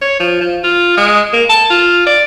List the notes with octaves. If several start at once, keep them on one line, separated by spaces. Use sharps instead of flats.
C#5
F3
F3
F4
G#3
A#3
A5
F4
D5